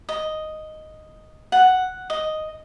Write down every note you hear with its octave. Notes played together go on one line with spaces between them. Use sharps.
D#5
F#5
D#5